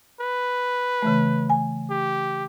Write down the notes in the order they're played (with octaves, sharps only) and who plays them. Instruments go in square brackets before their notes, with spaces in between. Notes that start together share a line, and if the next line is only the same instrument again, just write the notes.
[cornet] B4
[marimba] C#3 E3 A3
G#5
[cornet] G4